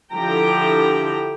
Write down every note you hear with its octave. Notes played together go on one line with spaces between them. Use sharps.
D3 F3 E4 G4 G5 A#5